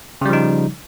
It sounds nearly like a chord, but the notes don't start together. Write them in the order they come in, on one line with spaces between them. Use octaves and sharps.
C#3 G3 F3 D#4